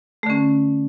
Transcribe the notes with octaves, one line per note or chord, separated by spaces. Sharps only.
D3 A3 C#4